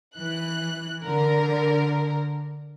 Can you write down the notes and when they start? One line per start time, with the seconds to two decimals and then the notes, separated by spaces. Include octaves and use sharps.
0.18 E3 F#6
1.04 D3 A#4